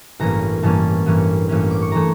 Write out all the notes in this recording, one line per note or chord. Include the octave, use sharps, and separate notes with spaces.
A1 G2 E3 A#3 C#4 A#5
A1 G2 E3 A#3 C#4 A5
A1 G2 E3 A#3 C#4
A1 G2 E3 A#3 C#4
D6
C#6
E3 A3 A#5